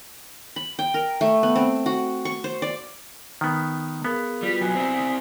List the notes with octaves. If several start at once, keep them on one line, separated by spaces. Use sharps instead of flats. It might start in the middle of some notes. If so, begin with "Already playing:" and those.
B5
G5
A#4
A3
B3
C4
F#4
C#6
C5
D5
D#3 B3
B3 G#4 A#4 F5
G3 F4 F#4 B4
B1 F#3 G#5
C4 E4